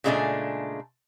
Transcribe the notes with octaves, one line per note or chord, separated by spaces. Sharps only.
A#2 C#3 G#3 A3 D4 G#5